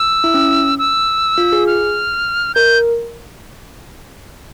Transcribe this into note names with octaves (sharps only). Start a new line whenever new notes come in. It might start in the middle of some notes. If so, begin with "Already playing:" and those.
Already playing: E6
E4
C#4
E6
F4
G#4
F6
A#4 G6